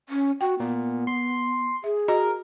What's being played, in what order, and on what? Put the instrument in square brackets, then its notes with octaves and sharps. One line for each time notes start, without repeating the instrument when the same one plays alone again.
[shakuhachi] C#4
[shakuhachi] F#4 [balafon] G5
[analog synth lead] A#2 [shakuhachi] B3
[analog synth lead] C6
[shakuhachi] G#4 [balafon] E5
[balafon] F#4 D#5 [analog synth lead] A#4